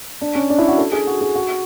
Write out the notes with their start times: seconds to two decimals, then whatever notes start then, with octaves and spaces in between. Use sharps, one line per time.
0.21 D4
0.35 C#4
0.50 D4
0.58 E4
0.68 F#4
0.78 A4
0.92 G#4
1.07 F#4
1.21 G#4
1.35 F#4